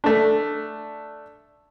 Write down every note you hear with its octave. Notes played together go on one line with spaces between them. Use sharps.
A3 D4